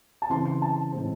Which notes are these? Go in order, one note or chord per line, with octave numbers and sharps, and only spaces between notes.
A5
C#3 E3 C4 C6
C6
A5
A2 E3 G#3 C4